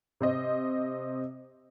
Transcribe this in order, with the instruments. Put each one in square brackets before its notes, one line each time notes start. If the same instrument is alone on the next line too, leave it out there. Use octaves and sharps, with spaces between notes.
[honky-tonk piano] C3 C5 D#5